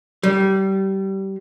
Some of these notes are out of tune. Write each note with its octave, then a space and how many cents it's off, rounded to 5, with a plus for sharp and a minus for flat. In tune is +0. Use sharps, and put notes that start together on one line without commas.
G3 -25